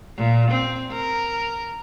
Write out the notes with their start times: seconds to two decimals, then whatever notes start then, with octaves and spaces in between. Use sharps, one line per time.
0.17 A#2
0.51 C4
0.92 A#4